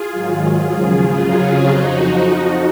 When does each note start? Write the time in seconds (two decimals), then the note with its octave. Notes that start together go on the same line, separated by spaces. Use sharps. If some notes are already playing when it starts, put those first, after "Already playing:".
Already playing: F4 G#4
0.12 G#2 D#3 F#3
0.43 G#2 F#3 F4 G#4
0.74 D#2 C#3 F3
1.05 F#2 C#3 F#3
1.36 F2 C#3 F#3 F4 G#4
1.67 F2 F3 D#4 F#4